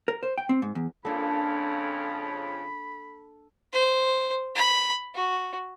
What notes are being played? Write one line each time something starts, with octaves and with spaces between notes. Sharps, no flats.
A#4
C5
G5
C4
G#2
E2
F2 C#3 A#3 D4 A4 B5
C5
B5
F#4